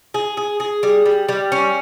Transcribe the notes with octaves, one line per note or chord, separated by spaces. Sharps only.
G#4
G#4
G#4
G3
G3
G3
C#4